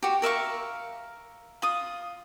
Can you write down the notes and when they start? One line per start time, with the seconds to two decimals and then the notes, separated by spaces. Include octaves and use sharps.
0.03 F#4 G4
0.22 A#4 E5 F5 C#6
1.62 F4 D#6